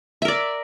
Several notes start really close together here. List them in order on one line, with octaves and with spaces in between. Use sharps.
E5 A#4 D5